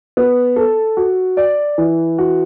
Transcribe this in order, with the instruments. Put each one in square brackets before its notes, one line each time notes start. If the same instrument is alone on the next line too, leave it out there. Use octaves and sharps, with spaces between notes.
[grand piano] B3
A4
F#4
D5
E3
F#4